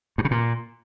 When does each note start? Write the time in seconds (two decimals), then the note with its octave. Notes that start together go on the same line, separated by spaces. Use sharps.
0.18 G2
0.25 C#3
0.31 A#2